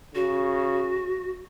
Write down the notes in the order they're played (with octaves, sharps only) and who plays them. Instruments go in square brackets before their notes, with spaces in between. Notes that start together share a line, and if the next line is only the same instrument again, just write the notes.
[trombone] C#3 [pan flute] F#4